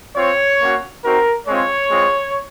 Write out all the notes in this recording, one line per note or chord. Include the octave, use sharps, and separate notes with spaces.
C4 F4 C#5
A#3 C#4 F#4
C4 D#4 F#4 A#4
G#3 C4 F4 C#5
G#3 C4 F4